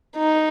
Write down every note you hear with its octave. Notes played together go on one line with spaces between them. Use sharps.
D#4